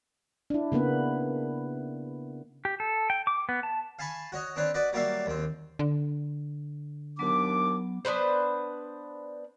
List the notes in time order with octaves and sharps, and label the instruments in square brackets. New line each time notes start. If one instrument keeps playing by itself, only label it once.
[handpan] D4 E4
C#3 A#3 B3 B4
[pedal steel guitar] G4
A4
G5
D6
B3
A5
[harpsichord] F5 G#5 A5 B5 C#6
F#4 C#5 D#5
C4 D4 B4 C#5
F#4 B4 D5 D#5
F#3 G3 A#3 D5 E5 F5
D#2 C4
[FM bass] D3
[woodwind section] D#2 D4 D6 [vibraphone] F#3 B3
[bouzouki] B3 D4 B4 C5